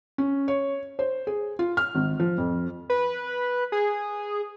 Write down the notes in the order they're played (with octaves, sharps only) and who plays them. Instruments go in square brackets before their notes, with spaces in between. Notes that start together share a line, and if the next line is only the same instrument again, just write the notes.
[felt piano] C#4
C#5
C5
G#4
F4
F6
G#1
F3
F2
[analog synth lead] B4
G#4